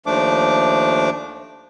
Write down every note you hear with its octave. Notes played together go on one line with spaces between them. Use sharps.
D#2 F3 A3 D4 D6